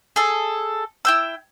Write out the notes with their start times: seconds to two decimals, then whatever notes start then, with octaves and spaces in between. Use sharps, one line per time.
0.16 G#4 A4
1.05 E4 G5 E6